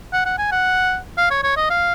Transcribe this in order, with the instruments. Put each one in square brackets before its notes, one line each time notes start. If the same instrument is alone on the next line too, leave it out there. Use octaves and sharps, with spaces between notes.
[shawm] F#5
F#5
G#5
F#5
F5
C#5
C#5
D#5
F5